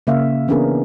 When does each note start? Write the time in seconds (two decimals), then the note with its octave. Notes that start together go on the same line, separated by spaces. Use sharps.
0.07 C#3 A#3 E5 F5
0.48 E3 B3 C#4 D4 G#4 A#4